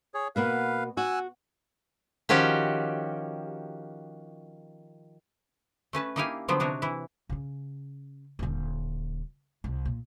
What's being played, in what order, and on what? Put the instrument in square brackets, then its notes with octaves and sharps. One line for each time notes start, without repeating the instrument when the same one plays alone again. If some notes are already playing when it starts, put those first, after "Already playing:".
[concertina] G#4 C#5
[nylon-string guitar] B2 A#3 B3 [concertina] B4 F5
[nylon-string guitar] F#4 [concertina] G#5 E6 F#6
[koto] D#3 F3 C#4 F#4 G4
A3 C#4 B4 A5
A#3 D#4 E4 G4 F5 G#5
D3 F3 F#3 B3 C4
C3 D4 D#4 F#4 C#5
E3 E4
[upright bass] C#3 C#4
D#1 D3
C2
A#2